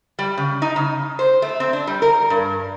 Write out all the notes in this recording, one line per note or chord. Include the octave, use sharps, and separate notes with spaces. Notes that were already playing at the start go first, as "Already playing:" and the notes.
G3
C#3
D#4
C#3
C5
A3
C4
D4
G3
A#4
G2